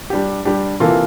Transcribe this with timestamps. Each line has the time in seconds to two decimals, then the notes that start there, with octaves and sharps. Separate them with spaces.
0.10 G3 D4 G4
0.45 G3 D4 G4
0.80 C3 E3 A#3 F4 A4